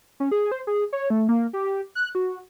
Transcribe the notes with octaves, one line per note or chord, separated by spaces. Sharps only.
C#4
G#4
C5
G#4
C#5
A3
A#3
G4
F#6
F#4